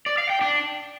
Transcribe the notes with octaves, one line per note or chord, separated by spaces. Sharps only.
D5
F5
G5
D4